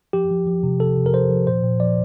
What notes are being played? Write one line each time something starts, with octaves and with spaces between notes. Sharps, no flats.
F3 G4
F3
F3
C3
C3 A4
C3
A#4
F3 C5
F3
A#2 C5
A#2
F3 D5